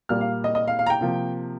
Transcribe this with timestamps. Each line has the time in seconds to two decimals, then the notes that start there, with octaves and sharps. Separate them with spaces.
0.09 A#2 G3 A#3 F6
0.21 F5
0.44 D#5
0.55 D#5
0.68 F5
0.79 F5
0.86 A#5
0.90 G5
1.01 C3 F3 A#3